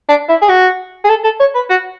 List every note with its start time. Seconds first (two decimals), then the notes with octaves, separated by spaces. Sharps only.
0.09 D4
0.29 E4
0.42 G#4
0.49 F#4
1.04 G#4
1.09 A4
1.24 A4
1.40 C#5
1.55 B4
1.70 F#4